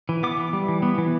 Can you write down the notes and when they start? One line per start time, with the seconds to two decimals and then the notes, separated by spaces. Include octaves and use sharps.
0.09 E3
0.23 B3 D6
0.38 E3
0.53 G3
0.68 E3
0.82 B3
0.98 E3